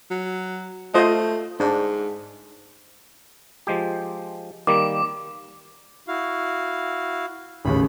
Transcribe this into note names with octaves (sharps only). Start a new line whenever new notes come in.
F#3
A3 F4 C5 D#5
G#2 D4
F3 G#3 G4
D#3 G3 A#3 D6
E4 F#4 F5
A1 D#2 C#3 B5